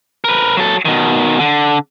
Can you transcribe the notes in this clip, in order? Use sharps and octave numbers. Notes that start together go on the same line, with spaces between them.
A#4 B4
F#3 A4
B2 D#3
D3